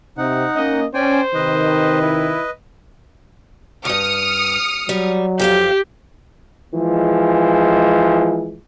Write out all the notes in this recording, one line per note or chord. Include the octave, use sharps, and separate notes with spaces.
C3 D#4 F#5
A#3 C#4 D#5
C#4 C5 D5 G5 G#5
C3 D#3 B4 D#5
E4
D2 G2 D#6 F6 C#7
F#3 G3
F2 G4 A4 F5
E3 F3 G#3